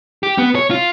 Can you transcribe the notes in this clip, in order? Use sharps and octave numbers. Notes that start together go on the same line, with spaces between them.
G4
B3
C#5
F4